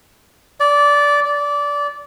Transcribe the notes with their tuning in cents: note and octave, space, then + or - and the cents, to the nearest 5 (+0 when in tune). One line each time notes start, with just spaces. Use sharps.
D5 -15
D5 -20